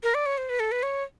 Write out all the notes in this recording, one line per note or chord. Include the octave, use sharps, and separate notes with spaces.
A#4
D5
C#5
C5
B4
A4
B4
C#5